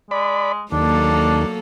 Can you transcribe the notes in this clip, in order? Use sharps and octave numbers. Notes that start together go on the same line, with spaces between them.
G#3 D5 B5
D#2 F#3 A#3 D4 A4